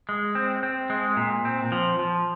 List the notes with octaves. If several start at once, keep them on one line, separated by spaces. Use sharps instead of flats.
G#3
C4
C4
G#3
A#2
C4
F3
F3